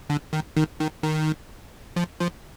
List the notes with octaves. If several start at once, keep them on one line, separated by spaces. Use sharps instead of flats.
D3
D#3
D#3
D#3
D#3
F3
F3